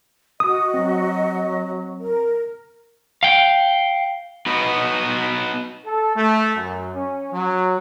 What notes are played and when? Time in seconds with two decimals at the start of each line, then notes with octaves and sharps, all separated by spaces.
0.40 F#4 D#5 D#6
0.74 F#3 C4
1.99 A#4
3.23 F5 G5
4.46 B3 D#4 F#4 B4
5.85 A4
6.15 A3
6.55 F#2
6.95 C#4
7.32 F#3